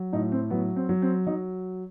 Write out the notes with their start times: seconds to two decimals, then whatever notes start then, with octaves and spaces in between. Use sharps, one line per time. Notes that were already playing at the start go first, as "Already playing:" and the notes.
Already playing: F#3
0.13 A2 D#4
0.32 C4
0.50 F#3 B3
0.76 C4
0.89 F#3
1.02 C4
1.27 F#3 D#4